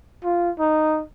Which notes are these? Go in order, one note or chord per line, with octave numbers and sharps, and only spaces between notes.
F4
D#4